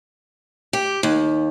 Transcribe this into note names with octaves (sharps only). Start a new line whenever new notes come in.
G4
D#2